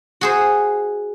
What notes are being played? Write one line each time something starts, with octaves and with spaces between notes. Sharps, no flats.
F#4 G#4 C5